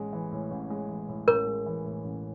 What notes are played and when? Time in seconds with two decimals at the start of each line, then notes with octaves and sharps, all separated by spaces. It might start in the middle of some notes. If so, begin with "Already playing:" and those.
Already playing: A1 G#3
0.13 E3
0.32 A2
0.51 A1
0.70 G#3
0.89 E3
1.09 A2
1.28 A1 A#4
1.47 G#3
1.66 E3
1.86 A2
2.04 A1